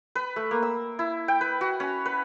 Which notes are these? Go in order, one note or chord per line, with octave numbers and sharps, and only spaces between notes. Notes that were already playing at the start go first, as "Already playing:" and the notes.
B4
A3
A#3
E6
E4
G5
B4
F#4
C#4
B4